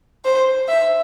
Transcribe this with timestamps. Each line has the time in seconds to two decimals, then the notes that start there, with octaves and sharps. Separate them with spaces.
0.25 C5
0.69 E5